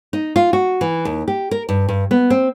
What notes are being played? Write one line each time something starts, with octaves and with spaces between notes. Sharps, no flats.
D#4
F4
F#4
E3
D#2
G4
A#4
G2
G2
B3
C4